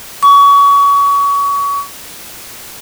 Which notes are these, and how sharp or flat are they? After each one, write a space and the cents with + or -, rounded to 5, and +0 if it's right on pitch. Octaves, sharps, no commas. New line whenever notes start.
C#6 +30